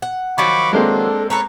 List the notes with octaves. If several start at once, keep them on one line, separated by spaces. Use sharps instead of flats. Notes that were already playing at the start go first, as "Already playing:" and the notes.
F#5
D#3 F3 F#3 B5 C#6 D6
G#3 A#3 C4 D4 A4
A4 B4 C#5 A#5